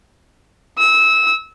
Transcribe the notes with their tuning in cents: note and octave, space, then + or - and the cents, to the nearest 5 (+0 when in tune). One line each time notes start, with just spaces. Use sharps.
E6 -25